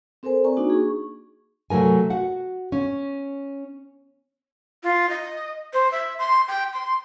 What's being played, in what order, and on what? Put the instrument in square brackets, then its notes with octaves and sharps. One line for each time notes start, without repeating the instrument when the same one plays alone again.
[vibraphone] C4 A4 A#4 C5 G#5
D5 G#5 A#5 C#6
A#3 D4 D#4 F#4
G#4 C#6
[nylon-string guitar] C3 F#3 A3 A#4 G#5
F#4 F#5
C#4
[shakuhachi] F4
D#5
C5
E5
C6
G5
C6